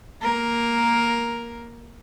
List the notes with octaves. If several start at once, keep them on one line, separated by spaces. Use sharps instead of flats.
A#3 A#4